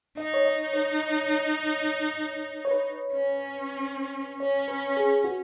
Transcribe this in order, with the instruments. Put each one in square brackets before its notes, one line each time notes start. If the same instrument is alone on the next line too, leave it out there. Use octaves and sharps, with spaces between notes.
[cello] D#4 [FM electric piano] D#5
[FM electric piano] C#5
D#5
C#5
C#5
B4
[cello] C#4
[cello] C#4 [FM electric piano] C#5
[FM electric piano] B4
G#4
F#4